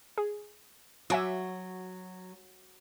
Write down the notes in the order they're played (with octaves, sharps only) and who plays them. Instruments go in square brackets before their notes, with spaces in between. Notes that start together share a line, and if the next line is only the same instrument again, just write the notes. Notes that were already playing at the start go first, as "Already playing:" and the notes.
[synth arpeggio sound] G#4
[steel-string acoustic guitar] F#3 [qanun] F#4 [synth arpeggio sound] E5 G#5 D6